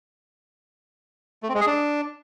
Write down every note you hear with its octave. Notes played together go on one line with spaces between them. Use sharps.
A3
C4
G#3
G#4
D4